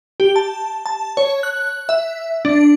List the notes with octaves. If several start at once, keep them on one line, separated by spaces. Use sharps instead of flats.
G4
A5
A5
C#5
F#6
E5
D4